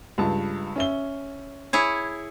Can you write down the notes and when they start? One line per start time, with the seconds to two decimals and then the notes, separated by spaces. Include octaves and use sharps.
0.18 C#2 G2 A5
0.76 C#4 E5 G7
1.73 E4 G#4 C#5